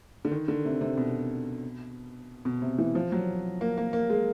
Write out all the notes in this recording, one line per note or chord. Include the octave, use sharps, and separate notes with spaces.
D3
D#3
D3
C3
C3
B2
B2
C3
E3
F3
F#3
A#3
A#3
A#3
G#3